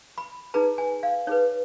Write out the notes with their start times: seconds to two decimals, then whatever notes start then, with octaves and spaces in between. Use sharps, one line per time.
0.18 B5
0.54 D#4 G#4 B4 A#5
0.78 G#5
1.03 F5
1.27 D#4 G#4 B4 C#5